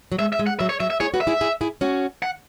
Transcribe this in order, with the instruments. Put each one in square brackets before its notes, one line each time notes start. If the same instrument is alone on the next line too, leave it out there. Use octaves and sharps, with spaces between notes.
[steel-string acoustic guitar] F#3
[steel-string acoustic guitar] G#3 [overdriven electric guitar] E5
[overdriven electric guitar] E5
[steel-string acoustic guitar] G#3
[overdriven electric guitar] F#5
[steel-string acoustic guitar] F#3 [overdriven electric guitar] E5
[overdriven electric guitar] C#5
[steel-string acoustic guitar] F#3 [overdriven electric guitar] E5
[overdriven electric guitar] E5
[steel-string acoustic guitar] E4 G#4 [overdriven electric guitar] C#5
[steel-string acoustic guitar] F#4 B4
[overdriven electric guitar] E5
[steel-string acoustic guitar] E4 G#4
E4 G#4
E4 G#4
C#4 F#4
[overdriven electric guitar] F#5